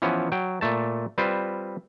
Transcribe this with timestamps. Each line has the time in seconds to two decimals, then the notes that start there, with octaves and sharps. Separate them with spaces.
0.02 E3 F3 B3 C#4
0.32 F#3 G5
0.61 A#2 A3 A5
1.18 G3 C4 F4 B4 C5